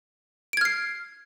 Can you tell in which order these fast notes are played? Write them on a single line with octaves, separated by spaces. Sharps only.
D7 G#6 F6 C7